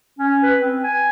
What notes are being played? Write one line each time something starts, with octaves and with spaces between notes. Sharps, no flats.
C#4
B4
C4
G#5